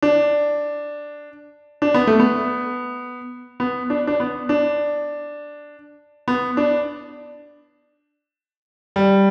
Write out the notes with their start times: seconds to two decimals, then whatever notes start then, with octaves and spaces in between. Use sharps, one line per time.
0.02 D4
1.82 D4
1.94 B3
2.07 A3
2.20 B3
3.60 B3
3.90 D4
4.07 D4
4.20 B3
4.49 D4
6.28 B3
6.57 D4
8.96 G3